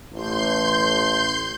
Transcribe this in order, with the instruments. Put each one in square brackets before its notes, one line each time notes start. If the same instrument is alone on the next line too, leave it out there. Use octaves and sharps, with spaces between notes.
[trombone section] A1 [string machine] C6 G6